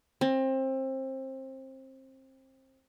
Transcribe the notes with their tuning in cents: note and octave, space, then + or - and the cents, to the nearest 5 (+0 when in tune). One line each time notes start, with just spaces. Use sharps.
C4 +25